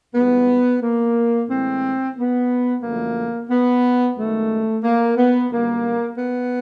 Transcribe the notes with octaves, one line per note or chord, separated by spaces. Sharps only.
G#2 E3 G3 B3
A#3
A2 E3 G#3 C4
B3
F#2 D3 F3 A3 A#3
B3
F#2 D#3 G#3 A3
A#3
B3
F#2 D3 G3 A#3
B3